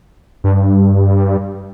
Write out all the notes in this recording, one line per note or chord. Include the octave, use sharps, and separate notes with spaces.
G2